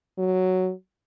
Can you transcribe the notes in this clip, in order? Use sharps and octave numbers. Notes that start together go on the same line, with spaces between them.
F#3